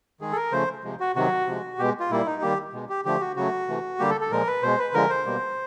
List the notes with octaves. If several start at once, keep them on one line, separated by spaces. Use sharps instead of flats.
D#3 G#3 G#4
A4
A#4
C#3 F3 A3 C5
C3 F3 G#3
F#4
C3 D#3 F#3 F#4
C3 F3 G#3
B2 G#3 G4
F4
A#2 G3 A#3 E4
D#4
D#3 G3 A#3 G4
B2 G#3
G4
D3 F3 A3 G4
F#4
C#3 F#3 A3 F#4
C3 E3 A3
D3 G3 A#3 G4
A4
A4
A#2 F3 G#3 A#4
B4
B2 G#3 C5
B4
D3 F3 G#3 A#4
C5
B2 G3 A#3